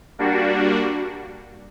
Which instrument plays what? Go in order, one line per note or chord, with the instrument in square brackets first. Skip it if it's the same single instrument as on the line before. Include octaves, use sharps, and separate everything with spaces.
[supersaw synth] G3 A#3 D4 F#4